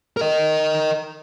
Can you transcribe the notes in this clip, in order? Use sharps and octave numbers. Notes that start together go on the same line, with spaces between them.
A#4 D#5